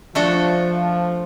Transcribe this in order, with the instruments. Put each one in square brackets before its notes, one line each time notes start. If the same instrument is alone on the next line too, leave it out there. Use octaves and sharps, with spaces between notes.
[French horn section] F3 [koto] A3 D4 F#4 A4